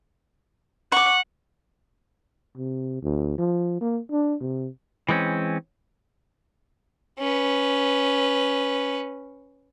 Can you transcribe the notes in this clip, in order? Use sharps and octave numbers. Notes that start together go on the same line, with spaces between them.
F#5 C#6 D6
C3
D2
F3
A#3
D4
C3
E3 G#3 C4 C#4
C#4 B4